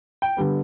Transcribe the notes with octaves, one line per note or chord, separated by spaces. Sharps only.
G5
D3 G3 B3